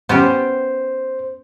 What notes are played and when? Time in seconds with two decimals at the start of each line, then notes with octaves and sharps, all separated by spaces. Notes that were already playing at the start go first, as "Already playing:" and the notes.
0.09 B3 C#4 G4 C5